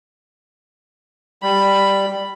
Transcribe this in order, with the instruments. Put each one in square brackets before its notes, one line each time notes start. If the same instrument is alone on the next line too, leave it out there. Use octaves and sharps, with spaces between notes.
[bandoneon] G3 [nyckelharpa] B5